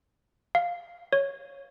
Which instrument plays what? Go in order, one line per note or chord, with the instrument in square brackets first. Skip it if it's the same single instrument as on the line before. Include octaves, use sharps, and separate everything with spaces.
[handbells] F5
C#5